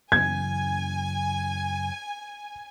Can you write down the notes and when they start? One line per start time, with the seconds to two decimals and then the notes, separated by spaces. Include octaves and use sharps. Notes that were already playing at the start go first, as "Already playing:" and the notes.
0.12 F#2 C#3 E3 G#5 G#6